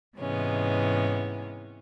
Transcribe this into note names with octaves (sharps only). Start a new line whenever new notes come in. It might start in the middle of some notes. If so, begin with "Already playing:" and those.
G#2 C3 E3 G#3 B3 C#4